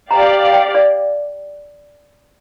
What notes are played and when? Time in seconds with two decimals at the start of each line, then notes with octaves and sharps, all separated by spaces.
0.11 G4 D5 F5 A#5
0.53 G5
0.75 D5